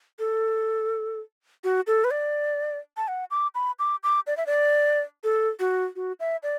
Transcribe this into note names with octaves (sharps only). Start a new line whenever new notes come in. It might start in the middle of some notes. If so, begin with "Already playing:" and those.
A4
F#4
A4
B4
D5
A5
F#5
D6
B5
D6
D6
D5
E5
D5
A4
F#4
F#4
E5
D5